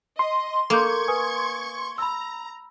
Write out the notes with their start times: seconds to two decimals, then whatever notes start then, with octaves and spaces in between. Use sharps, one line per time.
0.19 D#5 C6
0.70 A#3 A4 C#6 D6 G6 G#6
1.08 B4 G#5 D#6
1.98 A#5 B5 E6